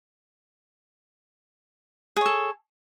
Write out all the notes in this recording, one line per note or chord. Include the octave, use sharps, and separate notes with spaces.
G#4 A4 C#5